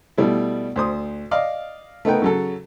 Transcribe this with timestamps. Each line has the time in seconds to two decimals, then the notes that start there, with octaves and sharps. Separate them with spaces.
0.18 B2 G3 A3 E4
0.76 D2 C5 D#6
1.31 D5 D#5 F5
2.05 A3 B3 D#4 A#4 B4 G5
2.22 C#3 F#3 A4